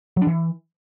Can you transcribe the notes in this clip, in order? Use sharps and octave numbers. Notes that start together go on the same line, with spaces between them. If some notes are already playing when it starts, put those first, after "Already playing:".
F#3
D4
E3